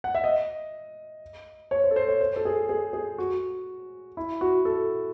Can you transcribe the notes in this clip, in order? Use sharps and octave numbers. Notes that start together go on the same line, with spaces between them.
F#5
E5
D#5
C#5
C5
A4
C5
C#5
C5
A4
G#4
G#4
G#4
F#4
E4
F#4
A4